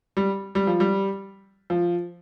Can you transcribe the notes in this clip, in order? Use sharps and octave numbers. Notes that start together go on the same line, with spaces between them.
G3
G3
F3
G3
F3